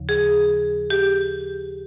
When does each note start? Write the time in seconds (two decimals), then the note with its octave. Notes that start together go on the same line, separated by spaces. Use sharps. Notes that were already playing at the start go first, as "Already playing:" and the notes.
Already playing: D#2 C#3 F3
0.09 G#4
0.90 G4